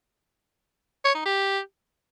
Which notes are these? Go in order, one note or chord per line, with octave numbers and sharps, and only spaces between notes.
C#5
D#4
G4